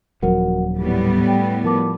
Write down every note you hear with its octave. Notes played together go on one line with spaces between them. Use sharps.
D#1 F3 F#3 F#4 A#4 F#5
A2 G3 B3 G4
G5
F3 A#4 A5 D6